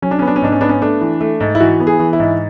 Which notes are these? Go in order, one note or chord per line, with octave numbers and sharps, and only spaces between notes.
F#3 C#4
D4
B3 C#4
D4
C#4
G#2 D4
C#4
B3 D4
C#4
A3 D4
E3
A3
G#2
E4
E3 F#4
B3
G#4
E3
E4
G#2